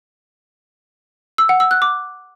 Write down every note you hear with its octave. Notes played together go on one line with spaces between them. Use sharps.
E6
F#5
E6
F#6
D6